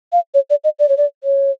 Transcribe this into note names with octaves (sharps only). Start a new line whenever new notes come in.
F5
C#5
D5
D#5
D5
C#5
D5
C#5